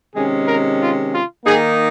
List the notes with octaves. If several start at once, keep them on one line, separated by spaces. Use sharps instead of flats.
C3 D#3 G#3 C#4 G#4
A#4
F4
F4
D#3 A#3 D#4 G#4